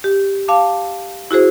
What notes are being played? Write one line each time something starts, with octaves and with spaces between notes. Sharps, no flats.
G4
F5 A5 D6
E4 F#4 G#4 C5